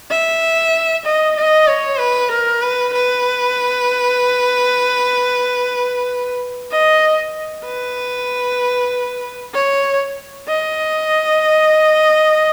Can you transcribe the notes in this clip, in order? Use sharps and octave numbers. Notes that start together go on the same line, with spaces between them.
E5
D#5
D#5
C#5
B4
A#4
B4
B4
D#5
B4
C#5
D#5